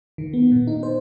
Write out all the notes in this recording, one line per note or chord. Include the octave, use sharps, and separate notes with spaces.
D#3
B3
A#2
D#4
C5